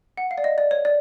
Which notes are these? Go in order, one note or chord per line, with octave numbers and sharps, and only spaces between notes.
F#5
F5
D5
D#5
D5
C#5
D5